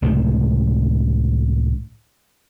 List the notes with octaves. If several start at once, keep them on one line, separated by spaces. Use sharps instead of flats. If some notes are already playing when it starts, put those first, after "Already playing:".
C#2 A2 C3 D#3